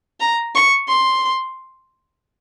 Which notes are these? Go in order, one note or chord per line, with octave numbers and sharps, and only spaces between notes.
A#5
C#6
C6